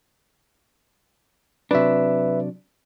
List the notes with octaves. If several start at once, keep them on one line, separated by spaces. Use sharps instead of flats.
C3 F#3 D4 B4 E5